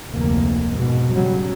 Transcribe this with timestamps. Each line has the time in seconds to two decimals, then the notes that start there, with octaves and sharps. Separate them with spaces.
0.11 F1 D2 A#3
0.72 G#2 B2
1.10 C#3 F#3 G3